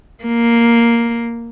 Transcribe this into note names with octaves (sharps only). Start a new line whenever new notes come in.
A#3